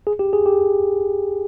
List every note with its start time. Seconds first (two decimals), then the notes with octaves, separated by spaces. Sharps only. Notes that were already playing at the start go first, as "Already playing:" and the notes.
0.07 G#4
0.19 G4
0.33 G#4
0.46 G4